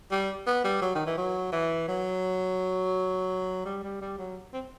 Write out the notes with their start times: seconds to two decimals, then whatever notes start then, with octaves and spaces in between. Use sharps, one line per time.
0.11 G3
0.47 B3
0.64 G3
0.82 F#3
0.95 D#3
1.06 E3
1.18 F#3
1.52 E3
1.89 F#3
3.65 G3
3.83 G3
4.01 G3
4.18 F#3
4.54 C4